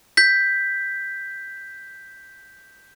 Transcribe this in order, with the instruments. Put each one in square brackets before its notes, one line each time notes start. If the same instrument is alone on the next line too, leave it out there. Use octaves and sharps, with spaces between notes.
[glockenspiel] G6 B6